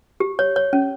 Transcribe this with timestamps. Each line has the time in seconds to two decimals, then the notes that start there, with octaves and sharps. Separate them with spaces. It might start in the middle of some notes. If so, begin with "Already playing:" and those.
0.20 G4
0.39 C#5
0.56 C#5
0.73 C#4